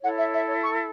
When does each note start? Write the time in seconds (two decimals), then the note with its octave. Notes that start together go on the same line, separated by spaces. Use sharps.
0.02 E4 A4 C#5 F#5
0.17 E5
0.32 E5
0.47 C#5
0.62 C#6